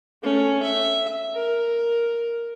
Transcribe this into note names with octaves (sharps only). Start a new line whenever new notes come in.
A3 C#4
E5
A#4